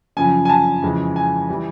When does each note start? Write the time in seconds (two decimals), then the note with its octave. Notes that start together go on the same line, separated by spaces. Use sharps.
0.17 F#2 C#3 F3 G#5
0.45 G#5
0.49 A5
0.82 F2 C#3 E3 G#3
1.16 G#5
1.49 E3 G3